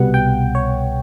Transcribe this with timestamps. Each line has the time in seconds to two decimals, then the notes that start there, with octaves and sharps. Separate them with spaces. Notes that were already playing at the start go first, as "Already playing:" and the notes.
Already playing: C2 B2 G3 B3 F#5
0.14 G5
0.55 C#5